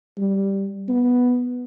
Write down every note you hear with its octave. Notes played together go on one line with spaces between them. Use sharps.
G3
B3